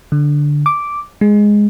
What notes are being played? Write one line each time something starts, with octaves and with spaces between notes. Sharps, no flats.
D3
D6
G#3